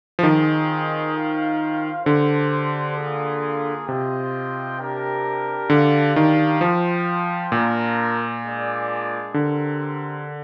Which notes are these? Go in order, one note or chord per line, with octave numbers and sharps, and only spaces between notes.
F3
D#3 C4 F4 G#4 D#5
F4 C5 F5
D3 D4 G4 C5
A#3 F4 G#4
C3 F4 C5 D#5 G5
D4 G4 A#4
D3 D4 G4 D5 F5
D#3
F3 F4 C5 G5
A#2 D4 F4 A#4
G#3 D4 G#4 D5
D3 C4 G4 A#4